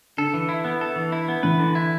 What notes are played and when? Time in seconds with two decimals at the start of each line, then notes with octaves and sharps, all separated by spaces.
0.17 D3 A4
0.34 E3
0.49 E4
0.64 B3
0.81 A4
0.96 E3
1.12 E4
1.28 B3
1.43 E3 B4
1.59 D3
1.75 E4